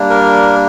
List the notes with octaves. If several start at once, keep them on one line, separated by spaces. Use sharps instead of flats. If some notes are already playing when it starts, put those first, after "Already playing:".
Already playing: G3 A#3 D4
A#4